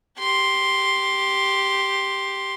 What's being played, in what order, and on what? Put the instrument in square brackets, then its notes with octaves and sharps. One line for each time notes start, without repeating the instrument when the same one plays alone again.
[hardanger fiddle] G4 C6